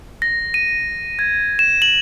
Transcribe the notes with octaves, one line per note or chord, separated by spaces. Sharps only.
A#6
D#7
G#6
E7
F#7